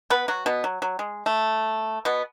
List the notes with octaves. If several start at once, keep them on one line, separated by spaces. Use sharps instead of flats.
B3 B4
F#3 F#4
B2 B3
F#3
F#3
G#3
A3
B2 B3